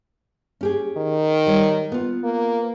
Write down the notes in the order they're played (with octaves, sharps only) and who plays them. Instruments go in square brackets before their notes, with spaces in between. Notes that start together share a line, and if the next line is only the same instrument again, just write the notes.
[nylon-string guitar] C#4 G4 G#4
[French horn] D#3
[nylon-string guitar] G3 C#5
B3 F4
[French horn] A#3